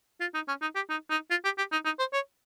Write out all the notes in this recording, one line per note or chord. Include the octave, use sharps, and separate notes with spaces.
F4
D#4
C#4
D#4
G4
D#4
D#4
F4
G4
G4
D#4
D#4
C5
C#5